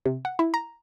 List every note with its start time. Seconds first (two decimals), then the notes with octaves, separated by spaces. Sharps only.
0.06 C3
0.25 F#5
0.39 E4
0.54 A#5